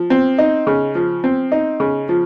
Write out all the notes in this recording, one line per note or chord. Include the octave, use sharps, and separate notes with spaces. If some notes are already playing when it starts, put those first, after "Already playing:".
Already playing: F3
C4
D#4
C#3
F3
C4
D#4
C#3
F3